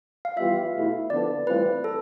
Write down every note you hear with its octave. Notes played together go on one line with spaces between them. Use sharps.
F5
E3 G3 B3 F4 E5
B2 A3 E4
D3 F3 B3 D4 A4 D5
A2 E3 G3 C4 F4 B4
A4